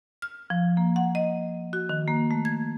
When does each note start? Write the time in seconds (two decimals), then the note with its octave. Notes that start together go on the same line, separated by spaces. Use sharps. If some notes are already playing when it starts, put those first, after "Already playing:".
0.22 F6
0.50 F3
0.77 A#3
0.96 F#5
1.15 D#5
1.73 F#4
1.89 D#3
2.08 A#3
2.31 A3
2.45 G#6